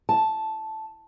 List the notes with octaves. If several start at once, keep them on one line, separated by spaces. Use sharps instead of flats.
A5